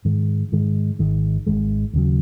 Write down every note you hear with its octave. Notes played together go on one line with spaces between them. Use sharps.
G#2 D#3 G#3
G#2 D#3 G#3
G#1 G#2 D#3 G#3
G#1 G#2 D#3 G#3
D#2 C#3 F#3